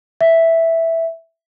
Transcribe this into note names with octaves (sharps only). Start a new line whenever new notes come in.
E5